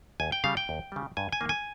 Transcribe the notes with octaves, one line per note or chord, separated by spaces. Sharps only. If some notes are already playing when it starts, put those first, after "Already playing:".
D#2 G#5
G5
C#3 G3 F5
G5
D#2
C#3 G3
G2 G#5
G#5
D#3 A#3
G#5